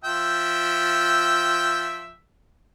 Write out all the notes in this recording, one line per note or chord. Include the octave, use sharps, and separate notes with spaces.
F3 E5 G5